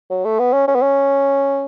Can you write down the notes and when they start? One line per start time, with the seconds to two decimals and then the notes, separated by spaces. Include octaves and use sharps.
0.10 F#3
0.25 A3
0.39 B3
0.53 C#4
0.67 C#4
0.75 B3
0.82 C#4